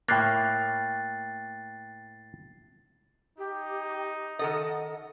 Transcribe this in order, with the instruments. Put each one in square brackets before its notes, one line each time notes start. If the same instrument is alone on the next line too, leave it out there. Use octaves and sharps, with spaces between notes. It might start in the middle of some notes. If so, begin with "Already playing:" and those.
[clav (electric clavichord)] A2 A#3 [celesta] G5 F#6 [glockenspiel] A6 C7
[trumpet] D#4 [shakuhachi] G4
[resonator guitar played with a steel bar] D#3 A4 D#5 [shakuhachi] F#5